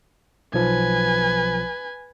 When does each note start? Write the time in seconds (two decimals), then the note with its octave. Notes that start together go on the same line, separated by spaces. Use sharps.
0.54 B1 F3 B4 G#5